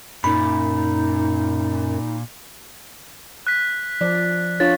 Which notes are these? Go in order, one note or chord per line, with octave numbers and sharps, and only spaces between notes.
F#2 A#2 D#4 B5
F#6 B6
F3 D5
D4 F4 C#5 A6